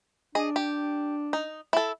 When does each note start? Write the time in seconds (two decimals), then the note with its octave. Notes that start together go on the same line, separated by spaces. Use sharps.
0.35 D4 G#4 D#5
0.56 G4
1.33 D#4
1.73 E4 A4